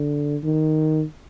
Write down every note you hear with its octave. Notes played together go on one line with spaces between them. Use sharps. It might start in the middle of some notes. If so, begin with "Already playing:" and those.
Already playing: D3
D#3